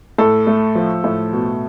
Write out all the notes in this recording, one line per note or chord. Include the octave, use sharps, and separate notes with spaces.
A2 A4
A3
F3
A2
B2